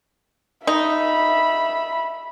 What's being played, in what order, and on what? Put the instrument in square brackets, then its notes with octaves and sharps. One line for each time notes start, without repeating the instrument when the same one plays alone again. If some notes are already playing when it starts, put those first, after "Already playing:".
[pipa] D#4 [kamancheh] E5 B5